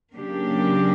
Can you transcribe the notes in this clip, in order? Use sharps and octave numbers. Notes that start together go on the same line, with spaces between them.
C#3 F#3 A#3 D4 G4